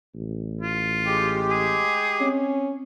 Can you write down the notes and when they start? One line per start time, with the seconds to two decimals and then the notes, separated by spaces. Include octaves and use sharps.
0.15 A1
0.61 F4
1.05 G#3 G4
1.51 G#4
2.20 C4 C#4